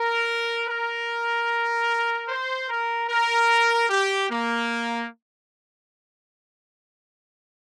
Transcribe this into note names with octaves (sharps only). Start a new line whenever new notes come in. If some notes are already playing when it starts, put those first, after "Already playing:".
Already playing: A#4
A#4
C5
A#4
A#4
G4
A#3